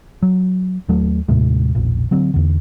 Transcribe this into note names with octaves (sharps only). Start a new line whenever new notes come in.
F#3
D#2 F#3 A3
D#2 A2 C3 G#3
E1 A#1
D3 F#3 C4
E2 D3